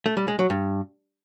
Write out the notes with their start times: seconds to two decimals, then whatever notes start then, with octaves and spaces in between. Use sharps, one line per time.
0.06 A3
0.17 G3
0.28 G#3
0.39 F#3
0.50 G2